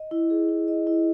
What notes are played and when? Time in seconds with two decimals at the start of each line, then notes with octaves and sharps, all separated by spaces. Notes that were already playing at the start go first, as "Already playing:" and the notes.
Already playing: D#5
0.11 E4
0.30 G#4
0.49 E4
0.68 D#5
0.87 E4